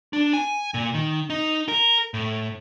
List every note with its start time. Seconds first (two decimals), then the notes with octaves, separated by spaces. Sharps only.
0.13 D4
0.33 G#5
0.74 A#2
0.94 D#3
1.30 D#4
1.68 A#4
2.14 A2